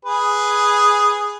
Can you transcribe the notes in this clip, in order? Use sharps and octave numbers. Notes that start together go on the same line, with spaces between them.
G#4 B4